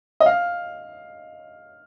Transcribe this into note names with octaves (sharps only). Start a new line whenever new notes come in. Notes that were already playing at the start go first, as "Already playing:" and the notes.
D#5
F5